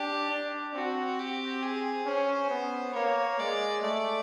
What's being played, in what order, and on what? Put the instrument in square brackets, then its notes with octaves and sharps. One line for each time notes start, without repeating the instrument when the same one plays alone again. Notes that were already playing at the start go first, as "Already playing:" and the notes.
Already playing: [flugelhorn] D4 [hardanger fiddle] G4
[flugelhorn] D4
[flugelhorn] C4 [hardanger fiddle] F#4
[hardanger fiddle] G4
G#4
[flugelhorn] C#4 [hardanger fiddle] C5
[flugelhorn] B3
[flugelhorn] A#3 [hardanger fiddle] C#5
[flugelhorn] G#3 [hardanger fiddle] D5
[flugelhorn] A3 [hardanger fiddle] D5